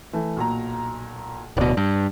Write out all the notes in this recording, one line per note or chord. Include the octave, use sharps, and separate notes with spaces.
E3 A3
B1 A#2 A#5
D1 B2 D5
G2